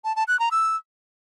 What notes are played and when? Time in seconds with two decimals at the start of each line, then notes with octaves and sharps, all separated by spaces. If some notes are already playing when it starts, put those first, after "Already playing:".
0.04 A5
0.16 A5
0.28 F#6
0.39 A#5
0.51 E6